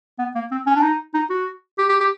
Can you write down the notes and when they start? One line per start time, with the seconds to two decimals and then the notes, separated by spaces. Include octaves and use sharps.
0.19 B3
0.35 A#3
0.51 C4
0.67 C#4
0.76 D4
0.83 D#4
1.14 D#4
1.30 F#4
1.78 G4
1.89 G4
2.00 G4